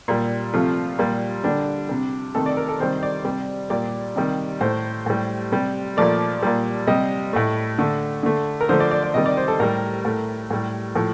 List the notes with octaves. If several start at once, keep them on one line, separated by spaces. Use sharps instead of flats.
A#2 G3
C3 F3 A3 F4
A#2 G3
D3 G3 D4
C3 G3
C3 D#3 A3 A4
D5
A#4
A4
C3 D#3 G3 C5
D5
C3 G3 D5
A#2 G3 D5
C3 D#3 G3
A2 A3 C5
A2 G3
C3 G3
A#2 F3 A3 D5
A#2 G3
C3 G3 D#5
A2 A3
D3 A3
D3 A3
A#4
D3 F3 A3 C5
D5
D5
D5
C3 D#3 G3 D#5
D5
C5
A4
A2 G3 A#4
A2 A3
A2 G3
A2 F3 A3